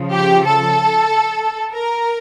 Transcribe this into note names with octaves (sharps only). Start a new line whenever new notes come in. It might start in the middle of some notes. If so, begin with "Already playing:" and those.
Already playing: C#3 F3
G4
A4
A#4